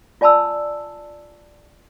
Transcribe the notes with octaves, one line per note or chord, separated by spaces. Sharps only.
F4 D5 G#5 A5 B5 E6